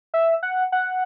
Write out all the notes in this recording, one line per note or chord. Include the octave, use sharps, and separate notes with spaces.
E5
F#5
F#5